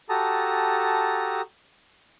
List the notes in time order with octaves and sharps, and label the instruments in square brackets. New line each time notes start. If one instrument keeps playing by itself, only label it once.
[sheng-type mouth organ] F#4 G4 A4 A5 A#5 D#6